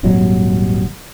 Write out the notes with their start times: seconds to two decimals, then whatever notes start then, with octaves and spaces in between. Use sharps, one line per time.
0.03 D#1 G#1 D#2 F#3